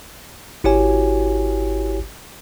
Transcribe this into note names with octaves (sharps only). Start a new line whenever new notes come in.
G#1 E4 F#4 G4 C#5 G#5